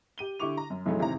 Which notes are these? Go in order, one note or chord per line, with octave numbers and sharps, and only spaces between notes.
G4 D#7 G7
D3 E4 G4 C#6 D6 F7
A#5
F#2
B1 F2 A2 F#3 G#3 A3
G#1 E2 C3 C4 E4 A#5